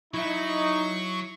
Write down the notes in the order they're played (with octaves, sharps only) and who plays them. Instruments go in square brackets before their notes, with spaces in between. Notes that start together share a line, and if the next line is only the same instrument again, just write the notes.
[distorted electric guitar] F#3 [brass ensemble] D#4 [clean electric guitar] E4 E5 [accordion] C#6